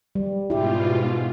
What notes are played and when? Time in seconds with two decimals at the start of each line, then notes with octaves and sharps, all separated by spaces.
0.15 G3
0.50 G#2 B2 E4 F4 G4